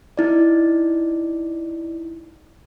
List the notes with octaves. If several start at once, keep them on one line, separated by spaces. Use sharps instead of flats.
D#4 E4 D5